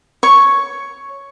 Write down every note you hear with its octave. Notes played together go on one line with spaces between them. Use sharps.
C#5 C#6